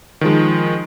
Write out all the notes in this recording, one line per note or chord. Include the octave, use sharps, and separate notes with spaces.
D#3 F3 G#3